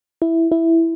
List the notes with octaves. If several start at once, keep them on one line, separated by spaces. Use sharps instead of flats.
E4
E4